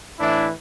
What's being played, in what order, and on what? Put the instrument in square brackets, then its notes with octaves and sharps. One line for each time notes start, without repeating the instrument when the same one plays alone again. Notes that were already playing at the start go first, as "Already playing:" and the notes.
[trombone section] A2 E3 D4 E4